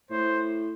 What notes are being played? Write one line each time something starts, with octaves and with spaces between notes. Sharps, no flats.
A2 C5